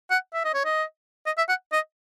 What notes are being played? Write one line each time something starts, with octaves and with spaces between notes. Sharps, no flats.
F#5
E5
D#5
C#5
D#5
D#5
E5
F#5
D#5